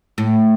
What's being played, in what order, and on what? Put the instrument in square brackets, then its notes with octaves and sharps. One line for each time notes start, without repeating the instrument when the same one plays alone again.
[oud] A2